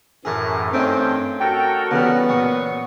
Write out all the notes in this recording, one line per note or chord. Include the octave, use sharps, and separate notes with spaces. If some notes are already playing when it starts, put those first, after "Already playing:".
F#2 A2 E3 G#4 A#4 A5
G2 A3 C4 C#4 D#4 G5
F#4 A4 A#4 G5
C#3 E3 G3 B3
A#2 F#3 C#6